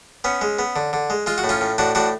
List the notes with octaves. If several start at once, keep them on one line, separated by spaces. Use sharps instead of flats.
B3 C#4
G#3
B3
D3
D3
G#3
G#3 F4
F#4
A2
C#4 F4
A2
A2 D4 F#4
A2 D4 F#4